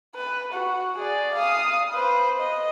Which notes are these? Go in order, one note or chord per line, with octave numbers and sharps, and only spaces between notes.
B4
F#4
G#4 D5
F5 D#6
B4 C5
D#5